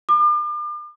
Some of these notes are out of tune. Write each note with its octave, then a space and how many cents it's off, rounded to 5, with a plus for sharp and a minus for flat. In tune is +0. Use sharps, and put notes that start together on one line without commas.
D6 +40